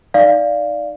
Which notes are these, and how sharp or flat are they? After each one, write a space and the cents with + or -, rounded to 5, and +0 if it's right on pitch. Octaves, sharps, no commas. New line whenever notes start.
D#4 +0 D5 +0 F5 -5